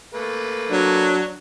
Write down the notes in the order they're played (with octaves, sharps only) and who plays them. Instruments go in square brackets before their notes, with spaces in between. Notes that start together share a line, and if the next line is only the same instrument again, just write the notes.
[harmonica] A3 A#3 B4
[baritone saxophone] F#3 [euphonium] D4